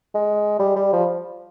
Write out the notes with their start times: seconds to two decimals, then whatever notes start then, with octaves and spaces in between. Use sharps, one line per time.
0.15 G#3
0.59 G3
0.76 G3
0.93 F3